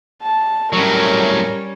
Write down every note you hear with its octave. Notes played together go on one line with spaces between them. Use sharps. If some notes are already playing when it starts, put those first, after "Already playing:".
A5
A2 F#3 G3 C#4 A#4 C#5